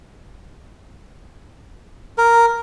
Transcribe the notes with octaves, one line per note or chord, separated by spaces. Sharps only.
A#4